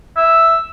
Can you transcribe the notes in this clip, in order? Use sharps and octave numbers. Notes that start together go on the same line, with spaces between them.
E5